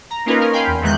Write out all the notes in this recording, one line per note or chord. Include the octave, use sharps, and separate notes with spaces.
A#5
A#3 C#4 D#4 F4 A#4 B4
C#4 A#4
F5 G5 G#5 B5 C6
E2
E2 D#3 E3 G#3 F#6 G6